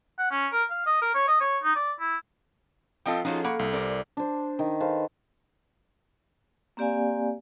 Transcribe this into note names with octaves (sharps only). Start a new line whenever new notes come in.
F#5
C#4
A#4
F5
D#5
A#4
C#5
D#5
C#5
D#4
D5
E4
F3 C4 F4 A4 D#5 G5
F3 C#4 D#4 F4 F#4 G#4 A4
A#3 F#5 B5 C#6
C2
A#4 C5 D5
D4 C5
D#3
A4 B4 C5 F5
A#3 C4 G4 D5 F5 G#5